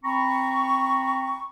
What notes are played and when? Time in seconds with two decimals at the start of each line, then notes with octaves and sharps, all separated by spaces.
0.04 C4 A#5 B5 C#6